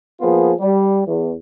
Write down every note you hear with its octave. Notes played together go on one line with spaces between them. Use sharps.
F3 A#3 B3 F4 G#4
G3
E2